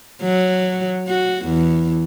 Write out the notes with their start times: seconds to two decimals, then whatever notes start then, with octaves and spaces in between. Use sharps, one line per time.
0.23 F#3
1.08 F#4
1.46 E2